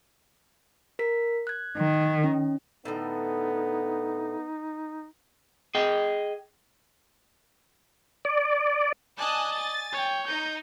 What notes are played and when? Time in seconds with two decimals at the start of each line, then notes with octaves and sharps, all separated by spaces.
0.99 A#4 B6
1.47 F#6 G#6
1.77 D#3
2.24 C#4
2.85 A2 D3 B3 D#4
5.75 G#4 D#5 G5
8.25 D5
9.18 D5 D#5 G#5 A5 F#6
9.53 G#5 A6
9.93 C#5 G5
10.27 D#4 G6